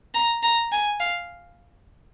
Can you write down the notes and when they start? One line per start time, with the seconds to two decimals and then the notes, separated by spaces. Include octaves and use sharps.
0.14 A#5
0.43 A#5
0.72 G#5
1.00 F5